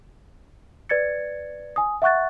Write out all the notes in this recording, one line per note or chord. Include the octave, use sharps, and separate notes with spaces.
B4 D5 G#6 A6 C#7
G#5 D#6
E5 F#5 C#6 F#6 A6